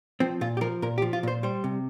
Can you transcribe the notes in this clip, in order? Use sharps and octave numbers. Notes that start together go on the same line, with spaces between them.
F3 C4
A#2 F4
G4
F3 A#4
A#2 A#4
G4
F3
F4
A#2 C5
G3 C5
C3